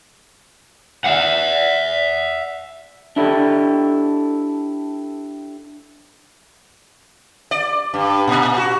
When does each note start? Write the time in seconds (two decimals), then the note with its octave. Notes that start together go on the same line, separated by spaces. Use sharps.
1.04 E5 F#5
3.16 D4 E4 G4 A4
7.51 D5
7.94 G2
8.28 A#2
8.58 F#4